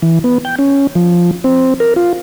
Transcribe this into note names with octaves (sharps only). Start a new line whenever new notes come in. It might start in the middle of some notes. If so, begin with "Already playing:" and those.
E3
B3
G5
C#4
F3
C4
A#4
F4